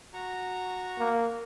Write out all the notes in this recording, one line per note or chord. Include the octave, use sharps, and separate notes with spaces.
F#4 A#5 C#6
A#3